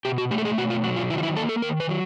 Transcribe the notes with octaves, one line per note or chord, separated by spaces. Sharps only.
B2 G4
F#4
A3 G4
A4
G#4
B2 F#4
F4
F#3 F#4
F4
D#3 E4
F4
E4
A#3 A4
A4
D#3 A#4
B4
F#3